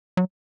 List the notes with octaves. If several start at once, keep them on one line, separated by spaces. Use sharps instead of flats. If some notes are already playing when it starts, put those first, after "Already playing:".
F#3